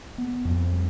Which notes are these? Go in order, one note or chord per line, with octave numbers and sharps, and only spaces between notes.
B3
F2
G3